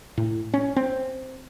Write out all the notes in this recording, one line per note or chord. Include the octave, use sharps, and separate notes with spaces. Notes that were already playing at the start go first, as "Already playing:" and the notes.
A2
C#4
C4